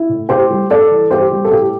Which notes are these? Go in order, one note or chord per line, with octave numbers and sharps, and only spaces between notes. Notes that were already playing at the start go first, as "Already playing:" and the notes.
Already playing: E4
A2
A2 G4 C5
G3
G2 A4 D5
E3
G2 G4 C5
G3
A4
A2 G4